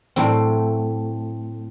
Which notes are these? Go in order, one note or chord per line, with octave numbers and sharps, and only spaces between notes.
A2 F#3 C4